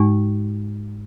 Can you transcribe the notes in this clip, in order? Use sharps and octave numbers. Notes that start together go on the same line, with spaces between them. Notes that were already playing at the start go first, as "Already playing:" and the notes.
Already playing: G#2 G#3 D#4